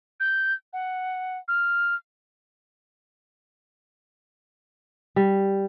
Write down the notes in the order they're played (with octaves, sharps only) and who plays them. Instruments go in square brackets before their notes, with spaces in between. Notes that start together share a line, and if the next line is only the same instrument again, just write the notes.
[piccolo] G6
F#5
F6
[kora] G3